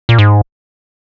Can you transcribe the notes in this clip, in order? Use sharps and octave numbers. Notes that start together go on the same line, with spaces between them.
A#2
G#2